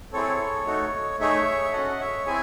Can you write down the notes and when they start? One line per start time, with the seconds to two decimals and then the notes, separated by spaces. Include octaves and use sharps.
0.13 C4 E4 G#4 A4 C#5
0.66 A3 D#4 F#4 A4
1.19 A3 D#4 G#4 C#5 E5
1.64 E5
1.73 C#4 F#4 A4 D#5 F#5
2.00 C#5 E5
2.26 C4 E4 G#4 E5 G#5